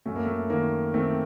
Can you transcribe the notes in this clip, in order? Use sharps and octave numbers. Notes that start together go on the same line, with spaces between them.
F#2 A3
A#3
A3
D#3 A#3
D#3 A3 C4